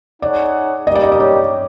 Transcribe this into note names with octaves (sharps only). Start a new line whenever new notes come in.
D#4 G#4 C#5 D5 F#5
G3 A#3 D#4 G4 D#5
D5
D#5
D5
C#5